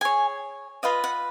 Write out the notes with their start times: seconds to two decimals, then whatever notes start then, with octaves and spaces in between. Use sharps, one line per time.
0.01 G#4 C#5 G#5
0.83 F4 B4 D#5 F5
1.04 F#5